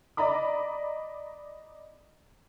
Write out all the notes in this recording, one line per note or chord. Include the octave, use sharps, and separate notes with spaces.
D5 D#5 A#5 B5 D6